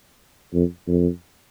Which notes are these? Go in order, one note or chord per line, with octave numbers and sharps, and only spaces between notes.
F2
F2